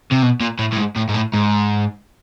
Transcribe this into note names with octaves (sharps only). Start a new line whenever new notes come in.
C3
B2
A#2
A2
A2
G#2
A2
G#2
A2
G#2